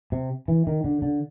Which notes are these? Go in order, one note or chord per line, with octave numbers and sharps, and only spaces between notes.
C3
E3
D#3
D3
D3